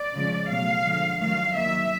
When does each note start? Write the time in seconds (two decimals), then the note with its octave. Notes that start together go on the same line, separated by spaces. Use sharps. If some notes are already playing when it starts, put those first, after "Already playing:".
Already playing: D5
0.15 C#3 F3 G#3
0.50 B2 F#3 A3 F5
0.85 D3 F3 G#3
1.20 D#3 F#3 A3 F5
1.55 D#3 F#3 A#3 E5